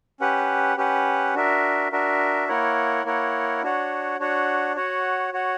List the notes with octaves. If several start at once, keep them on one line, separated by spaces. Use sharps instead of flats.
C#4 G4 B4 F#5
C#4 G4 B4 F#5
D4 F#4 A#4 E5
D4 F#4 A#4 E5
A#3 E4 A#4 C#5 F#5
A#3 E4 A#4 C#5 F#5
D4 F#4 C#5 F#5
D4 F#4 C#5 F#5
F#4 C#5 F#5
F#4 C#5 F#5